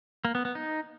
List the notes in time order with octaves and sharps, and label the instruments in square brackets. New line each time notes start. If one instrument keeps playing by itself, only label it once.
[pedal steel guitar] A#3
B3
B3
D#4